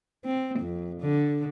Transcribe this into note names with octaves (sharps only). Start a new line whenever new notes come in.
C4
F2
D3